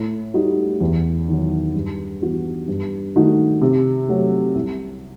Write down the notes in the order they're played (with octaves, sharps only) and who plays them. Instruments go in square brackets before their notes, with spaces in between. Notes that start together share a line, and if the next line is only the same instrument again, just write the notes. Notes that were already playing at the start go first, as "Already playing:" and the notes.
Already playing: [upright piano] A2
G3 D#4 F#4
E2
D#3 F#3
G2
E3 G3 B3 F#4
G2
D#3 A3 D#4 F#4
C3
F#3 A3
C2